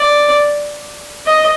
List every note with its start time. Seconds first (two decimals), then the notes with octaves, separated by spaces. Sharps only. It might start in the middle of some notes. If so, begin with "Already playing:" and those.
Already playing: D5
1.25 D#5